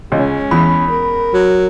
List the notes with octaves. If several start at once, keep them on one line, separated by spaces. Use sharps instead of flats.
C#2 G#3 C#4
E2 B5
A#4
F#3